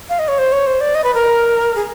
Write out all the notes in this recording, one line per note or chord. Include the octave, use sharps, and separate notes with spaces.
F5
D#5
C#5
C5
C#5
C5
D5
D#5
B4
A#4
G#4